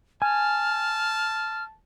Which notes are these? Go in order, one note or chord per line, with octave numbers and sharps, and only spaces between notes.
G#5 A5 F6